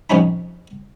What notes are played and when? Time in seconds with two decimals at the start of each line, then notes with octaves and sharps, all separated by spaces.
0.10 A#1 F2 C3 C#4 D#4 B5